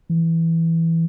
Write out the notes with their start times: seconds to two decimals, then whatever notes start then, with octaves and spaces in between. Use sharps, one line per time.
0.10 E3